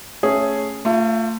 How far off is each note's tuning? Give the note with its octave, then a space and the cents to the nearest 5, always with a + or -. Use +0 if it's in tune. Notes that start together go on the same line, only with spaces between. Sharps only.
A3 +0 C#4 +0 G#4 +0
A3 +30 F4 +0